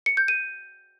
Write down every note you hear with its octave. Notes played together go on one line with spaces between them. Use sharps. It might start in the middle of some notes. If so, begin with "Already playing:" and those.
C#7
G6
D#7